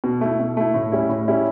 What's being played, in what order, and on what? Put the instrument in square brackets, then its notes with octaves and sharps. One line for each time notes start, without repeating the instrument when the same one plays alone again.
[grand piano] B2
A3 E4
B2
A3 E4
A2
G3 C#4 E4
A2
G3 C#4 E4